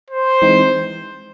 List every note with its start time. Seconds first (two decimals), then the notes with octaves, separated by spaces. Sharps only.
0.10 C5
0.42 E3 G#3 C4 D#4